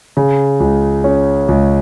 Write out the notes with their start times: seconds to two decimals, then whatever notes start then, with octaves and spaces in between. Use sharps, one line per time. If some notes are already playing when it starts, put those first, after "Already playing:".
0.17 C#3
0.60 C#2
1.04 C#4
1.48 C#2